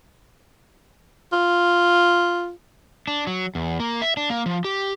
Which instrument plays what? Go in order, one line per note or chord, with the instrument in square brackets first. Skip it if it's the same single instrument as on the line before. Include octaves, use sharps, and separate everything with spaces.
[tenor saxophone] F4
[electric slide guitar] D4
F#3
E2
A#3
E5
D4
A#3
F3
G4